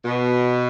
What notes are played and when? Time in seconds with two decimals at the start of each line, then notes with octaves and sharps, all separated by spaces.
0.05 B2